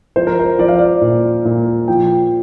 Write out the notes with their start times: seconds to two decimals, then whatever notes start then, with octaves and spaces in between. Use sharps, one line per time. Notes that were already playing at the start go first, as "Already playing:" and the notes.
0.16 F3 C5
0.27 A#4
0.39 C5
0.58 F3 D5
0.68 F5
0.78 D5
1.01 A#2
1.45 A#2
1.88 F3 G5